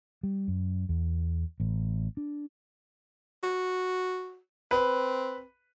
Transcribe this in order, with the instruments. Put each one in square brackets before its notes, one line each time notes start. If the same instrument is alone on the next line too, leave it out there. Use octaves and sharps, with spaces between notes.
[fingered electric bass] G3
F#2
E2
A1
D4
[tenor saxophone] F#4
[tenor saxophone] C4 [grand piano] B4